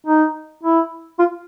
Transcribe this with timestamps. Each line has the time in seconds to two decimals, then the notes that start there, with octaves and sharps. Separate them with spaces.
0.07 D#4
0.63 E4
1.19 F4